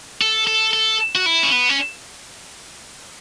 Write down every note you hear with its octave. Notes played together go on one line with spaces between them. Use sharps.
A4
A4
A4
F#4
E4
C#4
B3
C#4